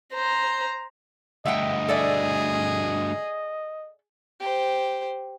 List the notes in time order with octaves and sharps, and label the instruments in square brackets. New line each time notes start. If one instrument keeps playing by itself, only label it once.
[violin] C5 A#5
[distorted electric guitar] D2 G2 [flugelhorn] D#5 [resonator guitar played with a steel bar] E5 F#5 G5
[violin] G#4 [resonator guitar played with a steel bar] A4 D5 E5
[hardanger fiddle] G4 C5